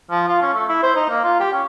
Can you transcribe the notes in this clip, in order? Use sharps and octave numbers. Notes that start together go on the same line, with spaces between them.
F3
F4
C#4
A3
E4
C5
D#4
A#3
F4
G4
C#4